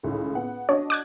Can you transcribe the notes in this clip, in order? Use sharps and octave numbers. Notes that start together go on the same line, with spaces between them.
C#2 A2 D#3
B3 F#5
D4 F#4 C#5 D#5
D6 F#6 G#6